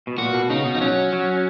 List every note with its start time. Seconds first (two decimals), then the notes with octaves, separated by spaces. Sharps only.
0.07 B2
0.18 A#2 F#4
0.34 B2
0.50 C#3 D#4
0.66 B2
0.75 F3 D#4
0.81 F#3 C#4
1.13 F#3